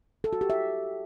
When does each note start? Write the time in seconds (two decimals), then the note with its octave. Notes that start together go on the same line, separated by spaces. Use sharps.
0.24 A4
0.33 F#4
0.41 G4
0.50 E5